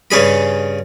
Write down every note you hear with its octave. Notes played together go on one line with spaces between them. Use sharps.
G2 C#3 C#4 G#4 B5